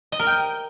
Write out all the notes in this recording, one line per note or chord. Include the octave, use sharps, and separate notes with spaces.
D#5
A#4
G5